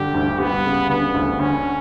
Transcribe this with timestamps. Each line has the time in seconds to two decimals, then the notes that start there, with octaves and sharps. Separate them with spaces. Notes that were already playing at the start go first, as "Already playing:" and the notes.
Already playing: G2 D3 G4
0.14 D2
0.40 G3 B3
0.65 C#3
0.90 D3 B3
1.15 D2
1.40 D3 C#4